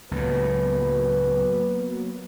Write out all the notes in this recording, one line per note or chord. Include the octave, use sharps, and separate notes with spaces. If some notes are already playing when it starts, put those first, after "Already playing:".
C#2 A2 F#3 A#3 B3 B4